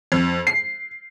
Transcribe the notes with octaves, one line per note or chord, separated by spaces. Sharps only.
F2
C7